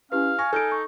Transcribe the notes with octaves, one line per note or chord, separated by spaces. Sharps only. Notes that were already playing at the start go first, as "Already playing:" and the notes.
C#4 E4 G4 B4 F5
G#5 C#6 A#6
D#4 A4 F6 D7
C#6